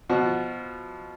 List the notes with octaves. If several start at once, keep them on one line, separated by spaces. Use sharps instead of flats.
B2 F3 F#4